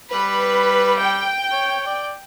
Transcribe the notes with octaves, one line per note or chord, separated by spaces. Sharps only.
G3 B4
G5
C#5
D5